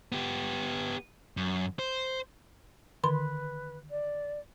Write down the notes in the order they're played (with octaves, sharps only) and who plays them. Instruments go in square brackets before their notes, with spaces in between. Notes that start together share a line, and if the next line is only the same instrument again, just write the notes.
[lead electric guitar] B3 G4
F#2
C5
[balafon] D3 D#3 C6 [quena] B4
[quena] D5